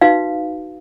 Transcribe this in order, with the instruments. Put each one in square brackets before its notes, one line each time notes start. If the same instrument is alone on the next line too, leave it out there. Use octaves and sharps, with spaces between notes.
[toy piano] D#4 F#4 B4 F5